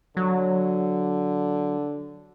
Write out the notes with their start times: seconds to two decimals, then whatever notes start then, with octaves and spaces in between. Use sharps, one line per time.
0.17 D3 F#3